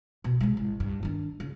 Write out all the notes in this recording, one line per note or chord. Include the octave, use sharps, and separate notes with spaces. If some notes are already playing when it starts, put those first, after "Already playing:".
B2
C3 G#3
A1
G2 G3
D#3 D4
C#3